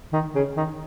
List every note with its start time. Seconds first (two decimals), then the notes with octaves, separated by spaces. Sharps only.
0.13 D#3
0.35 C#3
0.56 D#3